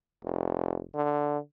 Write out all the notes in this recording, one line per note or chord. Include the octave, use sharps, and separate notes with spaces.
F1
D3